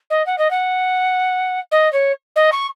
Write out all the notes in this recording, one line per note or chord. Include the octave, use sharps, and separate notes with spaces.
D#5
F#5
D#5
F#5
D#5
C#5
D#5
C#6